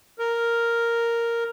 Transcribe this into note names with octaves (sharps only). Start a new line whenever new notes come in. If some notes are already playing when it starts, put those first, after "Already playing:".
A#4